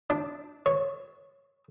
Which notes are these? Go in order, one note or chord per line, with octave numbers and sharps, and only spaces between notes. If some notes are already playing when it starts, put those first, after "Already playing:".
D4
C#5